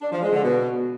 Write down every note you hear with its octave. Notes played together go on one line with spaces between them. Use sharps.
D4
F3
G#3
D3
B2